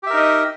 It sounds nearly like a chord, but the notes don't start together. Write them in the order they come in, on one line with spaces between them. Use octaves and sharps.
G4 E5 A#4 D#4 D#5